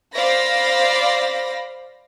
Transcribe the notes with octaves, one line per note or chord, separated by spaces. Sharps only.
C5 D5 F5 B5 A#6